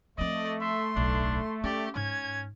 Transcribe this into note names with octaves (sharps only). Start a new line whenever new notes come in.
F3 A3 C4 D5 D#5
E5 C6
D1 B1 D4
C#4 G4 D5
G#2 C#4 G#6